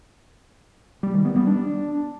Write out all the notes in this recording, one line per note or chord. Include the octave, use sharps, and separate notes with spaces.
G3
D#3
B3
G3
D4